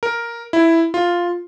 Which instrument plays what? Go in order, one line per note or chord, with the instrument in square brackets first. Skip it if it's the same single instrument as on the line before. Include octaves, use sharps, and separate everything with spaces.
[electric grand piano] A#4
E4
F4